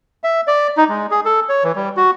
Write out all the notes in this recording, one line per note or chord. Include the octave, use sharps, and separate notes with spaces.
E5
D5
D#4
G#3
G#4
A4
C#5
E3
G3
F#4